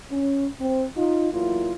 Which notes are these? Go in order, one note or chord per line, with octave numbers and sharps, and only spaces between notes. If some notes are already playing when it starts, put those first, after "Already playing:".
C#4
C4
D#4 F4
E2 F#3 A#3 E4 F4